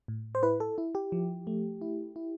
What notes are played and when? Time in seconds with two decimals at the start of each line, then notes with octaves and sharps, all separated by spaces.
0.08 A2
0.35 C5
0.43 E4 B4
0.60 A4
0.78 E4
0.95 G4
1.12 F3
1.47 A3
1.81 E4
2.16 E4